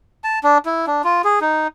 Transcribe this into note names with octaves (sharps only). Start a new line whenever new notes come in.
A5
D4
E4
D4
F4
G#4
D#4